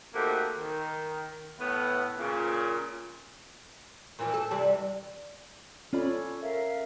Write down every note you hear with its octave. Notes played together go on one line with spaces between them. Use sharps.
A3 A#3 C4 D#4 F#4 G4
D#3
A2 B3
A#2 C#3
A#2 E3 F3
A4
C3 E3 G3
C#4 F4 A4 C#5 D5 B5
A#4 E5 F5